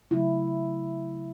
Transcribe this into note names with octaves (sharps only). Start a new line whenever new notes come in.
C#3 F#3 A3 E4